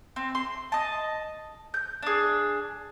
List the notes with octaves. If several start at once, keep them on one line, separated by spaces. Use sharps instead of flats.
C4
C6
D#5 A5
G6
D4 G#4